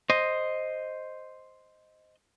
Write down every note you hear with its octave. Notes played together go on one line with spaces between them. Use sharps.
C5 D#5